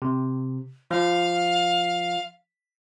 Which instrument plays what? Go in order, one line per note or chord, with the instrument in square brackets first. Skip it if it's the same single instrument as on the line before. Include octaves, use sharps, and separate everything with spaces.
[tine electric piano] C3
[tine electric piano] F3 [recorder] F5